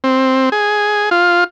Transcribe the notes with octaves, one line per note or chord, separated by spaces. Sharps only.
C4
G#4
F4